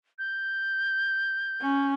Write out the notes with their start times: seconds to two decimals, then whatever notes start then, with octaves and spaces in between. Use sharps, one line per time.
0.19 G6
1.62 C#4